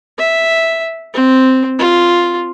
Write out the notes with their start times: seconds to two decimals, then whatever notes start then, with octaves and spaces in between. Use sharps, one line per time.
0.18 E5
1.14 C4
1.79 F4